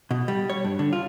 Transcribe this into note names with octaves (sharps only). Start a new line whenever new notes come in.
B2
G3
C#5
G2
D3
F4